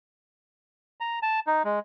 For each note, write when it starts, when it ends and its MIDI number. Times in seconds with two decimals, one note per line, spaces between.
1.01 1.19 82
1.23 1.40 81
1.47 1.63 63
1.65 1.79 56